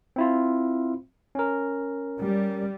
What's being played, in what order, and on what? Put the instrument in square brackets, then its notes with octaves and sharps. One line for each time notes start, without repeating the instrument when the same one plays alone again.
[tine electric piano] C4 E4 F4
C#4 A#4
[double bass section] G3